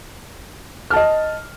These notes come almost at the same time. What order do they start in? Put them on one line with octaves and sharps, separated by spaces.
F6 A5 D#5